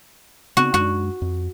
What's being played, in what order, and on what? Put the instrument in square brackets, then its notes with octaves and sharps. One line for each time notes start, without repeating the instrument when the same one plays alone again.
[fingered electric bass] C#3 B3 C4 [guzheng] F#4
[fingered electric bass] F#2 G#3 D4 [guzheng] F#4
[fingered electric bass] F2